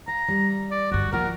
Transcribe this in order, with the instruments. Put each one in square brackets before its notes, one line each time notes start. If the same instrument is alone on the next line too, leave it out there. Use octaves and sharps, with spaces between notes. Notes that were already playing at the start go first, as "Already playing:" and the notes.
[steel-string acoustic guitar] F5 [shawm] A#5
[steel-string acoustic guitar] G3
[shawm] D5
[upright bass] G2 D3 [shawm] F#4
[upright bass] F3 [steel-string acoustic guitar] A#3 F4 F#4 [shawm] A#4